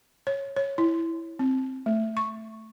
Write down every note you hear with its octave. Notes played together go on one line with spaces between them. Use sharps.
C#5
C#5
E4
C4
A3
C#6